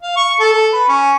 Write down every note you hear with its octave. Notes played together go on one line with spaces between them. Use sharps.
F5
C#6
A4
A4
B4
C#4